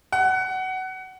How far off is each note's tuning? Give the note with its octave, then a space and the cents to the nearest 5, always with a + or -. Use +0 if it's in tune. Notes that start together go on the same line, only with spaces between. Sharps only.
F#5 +20